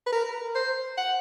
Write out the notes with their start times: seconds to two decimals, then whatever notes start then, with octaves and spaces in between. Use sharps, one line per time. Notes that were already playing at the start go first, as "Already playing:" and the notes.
0.06 B4
0.12 A#4
0.55 C5
0.98 F#5